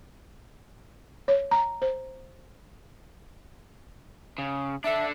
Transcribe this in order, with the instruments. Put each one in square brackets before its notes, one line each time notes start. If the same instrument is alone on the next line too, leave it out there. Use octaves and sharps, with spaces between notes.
[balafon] C#5
A#5
C5
[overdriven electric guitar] C#3
[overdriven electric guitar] D4 A4 [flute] E5